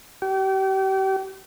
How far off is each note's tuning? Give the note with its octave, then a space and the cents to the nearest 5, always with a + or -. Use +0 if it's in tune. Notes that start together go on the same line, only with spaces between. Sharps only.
G4 -35